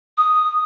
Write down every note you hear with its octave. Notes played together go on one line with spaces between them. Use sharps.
D#6